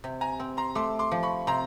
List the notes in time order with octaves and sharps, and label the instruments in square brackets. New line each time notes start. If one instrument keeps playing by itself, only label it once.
[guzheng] C3
[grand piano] G#5 A#5
[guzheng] C4
[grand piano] A#5 C6
[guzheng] A3 [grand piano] C6 D6
[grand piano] C6 D6
[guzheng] F3
[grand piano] B5 C#6
[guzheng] C3 [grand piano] A#5 C6